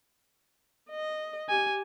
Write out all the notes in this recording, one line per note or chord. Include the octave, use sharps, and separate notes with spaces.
D#5
G4 G#5